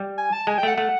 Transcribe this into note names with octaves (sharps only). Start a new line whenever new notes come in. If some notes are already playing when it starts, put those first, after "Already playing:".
Already playing: G3
G#5
A5
G#3 G#5
G5
A3 F#5
A3 F#5